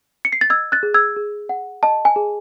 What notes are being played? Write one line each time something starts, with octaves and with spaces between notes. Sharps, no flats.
C#7
C7
A6
D#5 E6 G#6
F#6 A6
G#4
E6 G#6
G#4
F#5
D#5 A5
G#5
G#4